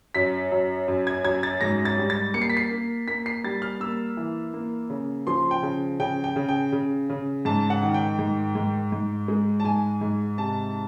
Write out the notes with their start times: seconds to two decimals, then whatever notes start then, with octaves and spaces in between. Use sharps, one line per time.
0.15 F#2 B6
0.52 F#2
0.88 F#2
1.07 G#6
1.25 F#2 G#6
1.43 A6
1.61 G#2 A#6
1.85 A6
1.98 G3
2.10 A6
2.34 A#3 C#7
2.42 C7
2.50 B6
2.57 C7
2.71 A#3
3.08 A#3 B6
3.26 C7
3.44 G3 A6
3.62 F6
3.80 A#3 E6
4.17 E3
4.54 A#3
4.90 C#3
5.27 F3 C6
5.51 G5
5.63 C#3
6.00 C#3 G5
6.24 G5
6.36 C#3
6.49 G5
6.72 C#3
7.10 C#3
7.45 G#2 A5
7.70 F#5
7.83 D#3
7.94 G5
8.19 G#2
8.55 G#2
8.92 G#2
9.28 G#3
9.60 A5
9.65 G#2 G#5
10.01 G#2
10.38 C3 A5